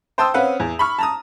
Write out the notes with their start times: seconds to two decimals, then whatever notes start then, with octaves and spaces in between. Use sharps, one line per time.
0.18 C5 G5 A5 C6 D#6 E6
0.34 C4 C#4 B4 F5 F#5
0.60 E2
0.79 B5 C#6 F6
0.98 A5 A#5 D#6